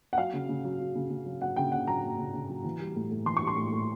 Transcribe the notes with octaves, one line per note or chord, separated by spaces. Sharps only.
F#5
F#3 F5
C#3
C#3
F#3
F#3
C#3
C#3
F#3
F#3 F#5
C#3 G5
C#3 F#5
F#3 A#5
F#3
C#3
C#3
F#3
E3
G3
A2
A2
E3 C6
C#6
G3
C6
A2
A2